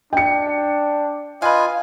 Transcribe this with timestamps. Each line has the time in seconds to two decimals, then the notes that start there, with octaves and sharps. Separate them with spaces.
0.13 D4 G5 C#7
1.42 F4 B4 D#5 F5 G#5